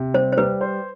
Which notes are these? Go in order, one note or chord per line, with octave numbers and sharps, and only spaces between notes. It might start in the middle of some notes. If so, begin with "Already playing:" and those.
Already playing: C3
G3 C5
C5
G3 B4
C5